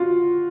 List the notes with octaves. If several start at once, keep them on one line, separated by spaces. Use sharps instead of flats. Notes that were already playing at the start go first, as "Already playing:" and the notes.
Already playing: F4 F#4